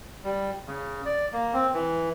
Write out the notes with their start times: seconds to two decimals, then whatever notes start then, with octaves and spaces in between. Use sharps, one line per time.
0.24 G3
0.67 C#3
1.06 D5
1.33 A#3
1.53 C4
1.73 E3